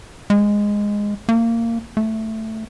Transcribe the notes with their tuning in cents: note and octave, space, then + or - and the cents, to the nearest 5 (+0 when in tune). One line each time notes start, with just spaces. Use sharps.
G#3 -10
A#3 -20
A3 +5